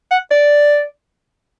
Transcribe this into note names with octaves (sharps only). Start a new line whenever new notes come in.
F#5
D5